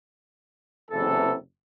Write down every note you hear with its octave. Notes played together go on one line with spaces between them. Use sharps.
F#1 E2 C3 E3 A4